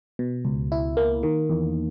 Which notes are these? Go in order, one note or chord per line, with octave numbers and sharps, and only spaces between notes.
B2
C#2
E4
A#3
D#3
E2